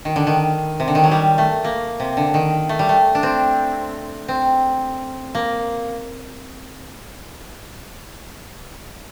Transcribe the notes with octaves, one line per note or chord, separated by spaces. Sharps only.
D#3
D3
D#3
C3
D3
D#3
F#3
G3
A3
A#3
C3
D3
D#3
A3
G3
A3
D4
C4
C4
A#3